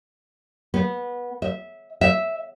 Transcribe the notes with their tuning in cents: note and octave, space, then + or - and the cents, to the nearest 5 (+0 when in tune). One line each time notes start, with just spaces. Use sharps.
B3 -20
E5 -15
E5 -5